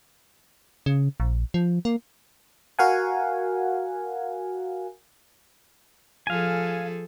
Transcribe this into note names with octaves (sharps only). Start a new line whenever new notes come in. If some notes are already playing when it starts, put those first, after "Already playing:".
C#3
A#1
F3
A#3
F#4 A#4 F5 F#5 G#5
F3 G#4 A4 F5 G#5